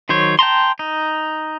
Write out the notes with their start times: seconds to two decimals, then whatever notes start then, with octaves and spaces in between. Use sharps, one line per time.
0.09 D#3 F#3 C5 C#5
0.39 G5 A5 A#5 C6
0.79 D#4